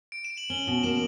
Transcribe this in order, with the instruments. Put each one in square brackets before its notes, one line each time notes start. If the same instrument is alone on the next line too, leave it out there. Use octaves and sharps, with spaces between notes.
[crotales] D7
E7
F#7
[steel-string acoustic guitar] C#4 [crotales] G7
[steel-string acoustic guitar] B2 [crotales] F#7
[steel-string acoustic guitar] A#3 [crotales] E7